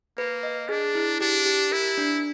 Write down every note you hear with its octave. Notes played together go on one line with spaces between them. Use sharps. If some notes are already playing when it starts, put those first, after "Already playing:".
A#3 B4
D#5
D4 G#4
E4
D4 G4
G4
E4 A#4
D4